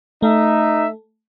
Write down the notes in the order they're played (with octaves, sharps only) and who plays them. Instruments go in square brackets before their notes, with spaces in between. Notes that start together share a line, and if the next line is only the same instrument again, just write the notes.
[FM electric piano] A3 [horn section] D#4 E5